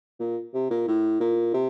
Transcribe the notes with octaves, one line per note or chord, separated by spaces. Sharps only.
A#2
C3
A#2
A2
A#2
C3